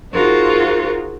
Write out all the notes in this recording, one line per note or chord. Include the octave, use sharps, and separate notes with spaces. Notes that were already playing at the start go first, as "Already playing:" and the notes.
D#4 F4 F#4 G#4 A#4 C5